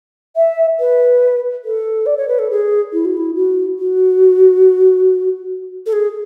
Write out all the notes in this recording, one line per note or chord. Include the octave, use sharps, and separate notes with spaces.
E5
B4
A4
D5
C#5
B4
A4
G#4
E4
F#4
E4
F#4
F#4
A4
G#4